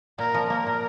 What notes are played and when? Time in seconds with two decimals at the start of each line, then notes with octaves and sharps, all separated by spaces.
0.18 A#2 A#4
0.34 F3
0.50 A#3 A#4
0.67 A#2